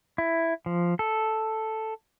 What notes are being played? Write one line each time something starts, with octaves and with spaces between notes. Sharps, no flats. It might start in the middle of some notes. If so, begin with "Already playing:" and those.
E4
F3
A4